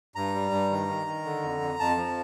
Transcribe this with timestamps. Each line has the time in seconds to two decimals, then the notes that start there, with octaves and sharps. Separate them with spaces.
0.15 G2 A#5
0.34 G3
0.51 G2
0.70 D#3
0.88 D#3
1.07 D#3
1.25 D3
1.43 F2
1.61 F2
1.80 F2 A5
1.97 F3